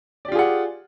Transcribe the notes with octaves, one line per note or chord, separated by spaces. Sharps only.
F4 G4 G#4 D5 F#5